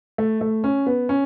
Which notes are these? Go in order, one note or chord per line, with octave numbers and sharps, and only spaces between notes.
A3
A3
C#4
B3
C#4